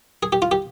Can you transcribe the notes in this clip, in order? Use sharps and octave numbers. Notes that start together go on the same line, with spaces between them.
G#4
G4
F4
G4